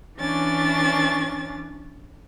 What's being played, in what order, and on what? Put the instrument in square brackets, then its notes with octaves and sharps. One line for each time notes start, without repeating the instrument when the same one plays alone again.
[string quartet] E3 C#4 D4 A6